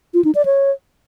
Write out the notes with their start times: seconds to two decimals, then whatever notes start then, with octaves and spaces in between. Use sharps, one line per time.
0.14 F4
0.24 D#4
0.35 D5
0.45 C#5